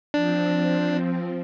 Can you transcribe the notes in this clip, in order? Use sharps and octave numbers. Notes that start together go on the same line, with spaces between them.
F3 C4 D4